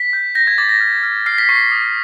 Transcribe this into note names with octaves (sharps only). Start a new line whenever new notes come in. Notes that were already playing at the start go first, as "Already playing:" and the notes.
Already playing: B6
G6
G6 A#6
G#6
D6 A6
A#6
F6
F6
F6 C7
B6
C#6 C7
D#6